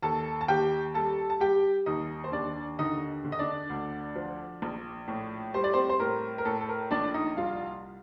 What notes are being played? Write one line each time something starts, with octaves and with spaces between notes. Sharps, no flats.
D#2 A4 A5
A5
D#2 G4 G5
G3 A4 A5
A5
G3 G4 G5
D#2 D#4 D#5
C5
D#2 D4 D5
D3 D#4 D#5
D3
D#5
D4 D5
D2
F3
A#1
A2
G3 C5
D5
C4 C5
C5
A2 A#4
A#4
A2 A4
A4
A#4
A#1 D4 D5
D#4 D#5
C2 F4 F5